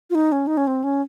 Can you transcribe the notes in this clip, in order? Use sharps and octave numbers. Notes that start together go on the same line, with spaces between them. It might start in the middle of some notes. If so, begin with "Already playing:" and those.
F4
D#4
C#4
D#4
C#4
C4
C#4